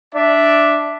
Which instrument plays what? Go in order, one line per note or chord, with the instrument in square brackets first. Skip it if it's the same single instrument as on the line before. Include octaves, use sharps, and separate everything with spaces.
[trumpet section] D4 D5 E5